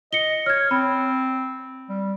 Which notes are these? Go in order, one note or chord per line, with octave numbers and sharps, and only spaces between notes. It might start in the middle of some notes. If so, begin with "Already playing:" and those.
D#5 C#7 G7
C#5 F6 G#6
C4 B5
G3